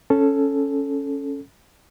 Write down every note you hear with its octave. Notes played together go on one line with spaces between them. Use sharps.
C#4 A4